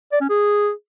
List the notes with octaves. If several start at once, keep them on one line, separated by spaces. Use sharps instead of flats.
D5
C#4
G#4